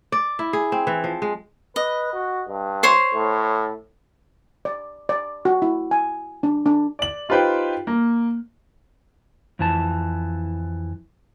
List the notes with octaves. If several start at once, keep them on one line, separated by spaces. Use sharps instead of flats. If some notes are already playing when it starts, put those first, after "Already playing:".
D5
E4
G#4
C4
E3
F3
G#3
B4 D#5
F#4
G2
C5 C#5 C6
A2
D5
D5
F#4
E4
G#5
D4
D4
D5 F#7
D#4 F4 G4 B4 C5 G5
A#3
F2 E3 A5